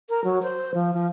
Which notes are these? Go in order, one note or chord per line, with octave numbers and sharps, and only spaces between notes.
A#4
F#3
C5
F3
F3